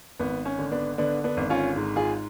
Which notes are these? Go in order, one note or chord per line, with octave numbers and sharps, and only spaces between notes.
G#1 B3
C#4
D3
B3 D4
D3 B3 D4
B3 D4
G#1
C#4 F4
G#2
F4 G#4